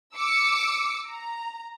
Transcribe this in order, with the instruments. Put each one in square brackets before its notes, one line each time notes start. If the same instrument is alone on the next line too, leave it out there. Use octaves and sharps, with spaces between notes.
[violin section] D6 E6 C#7
A#5